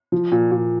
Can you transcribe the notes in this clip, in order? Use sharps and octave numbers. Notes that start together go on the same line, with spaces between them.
F3
A#2
A#2